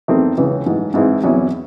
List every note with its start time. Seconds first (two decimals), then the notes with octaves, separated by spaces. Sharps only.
0.08 E2 D#3 A3 C4
0.38 C#2 C#3 E3
0.66 A1 G#2 E3
0.94 G#2 E3 C4 E4 G#4
1.23 E2 C3 F#3 C#4 E4